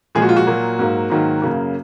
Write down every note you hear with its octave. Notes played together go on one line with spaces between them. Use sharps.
A#2 F3 G#3 G#4
F#4
F4
F#4
A#2 F#3 A#3
G#2 F#3 A#3
G#2 D#3 F#3 A#3
F#2 C#3 F#3 A#3